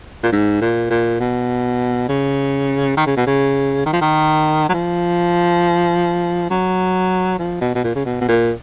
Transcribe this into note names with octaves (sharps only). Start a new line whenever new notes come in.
A#2
G#2
A#2
A#2
B2
C#3
D#3
C#3
B2
C#3
D#3
F3
D#3
F#3
F3
F#3
F3
B2
B2
A#2
C#3
B2
B2
A#2